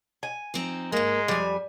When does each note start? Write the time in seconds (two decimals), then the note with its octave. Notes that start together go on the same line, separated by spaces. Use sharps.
0.23 G#5
0.54 F3 C4 D#4
0.92 G#2 G#3 A#3
1.28 F2 G3 G#5